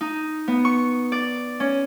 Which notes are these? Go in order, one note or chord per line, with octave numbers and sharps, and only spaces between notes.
D#4
B3
C#6
D5
C#4